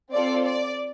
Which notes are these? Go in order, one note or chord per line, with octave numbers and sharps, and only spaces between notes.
C4 F4 A4 D5
D5